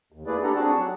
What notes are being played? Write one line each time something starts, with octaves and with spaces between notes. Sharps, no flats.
D#2
A3 A#3 E4 G#4 B4 D5
D4 G4 A4 D5 F#5 A#5
C4 D4 F#4 G#4 F#5 A5
F#3